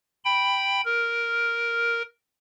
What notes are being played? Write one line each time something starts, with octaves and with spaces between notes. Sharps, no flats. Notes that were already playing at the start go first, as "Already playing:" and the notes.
G5 B5
A#4